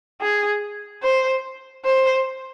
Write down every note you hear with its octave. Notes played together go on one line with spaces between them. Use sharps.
G#4
C5
C5